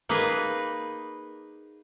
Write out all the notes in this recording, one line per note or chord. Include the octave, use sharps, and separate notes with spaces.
A#3 D#4 G#4 B4